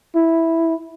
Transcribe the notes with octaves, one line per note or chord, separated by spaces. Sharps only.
E4